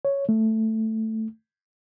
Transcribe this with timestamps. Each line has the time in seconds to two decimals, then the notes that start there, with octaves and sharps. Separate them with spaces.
0.05 C#5
0.29 A3